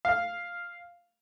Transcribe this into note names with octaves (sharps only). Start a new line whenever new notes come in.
F5